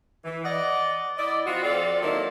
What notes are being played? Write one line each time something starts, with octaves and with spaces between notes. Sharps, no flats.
E3
D5 D#5 F#5
E4 D5 D#5
F3 C4 F4 F#4
F3 C4 F4 A4 D5
D#3 F#3 A#3 E4 A4 D5